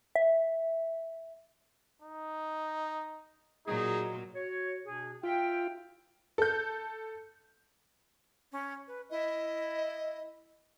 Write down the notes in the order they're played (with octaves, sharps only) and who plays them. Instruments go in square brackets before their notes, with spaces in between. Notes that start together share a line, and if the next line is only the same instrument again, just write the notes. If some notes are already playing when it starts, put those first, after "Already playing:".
[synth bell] E5
[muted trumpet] D#4
[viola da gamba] A#2 F#3 [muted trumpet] D#4 [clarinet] G#4
[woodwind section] F#4 C#5
B2 D4 G#4
[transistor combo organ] F4 [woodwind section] E5 F5 G5
[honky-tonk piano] A4 G6
[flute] C#4
B4
[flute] E4 [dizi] D#5